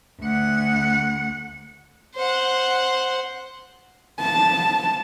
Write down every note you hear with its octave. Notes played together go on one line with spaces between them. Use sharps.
D2 F#5
C5 F#5
A5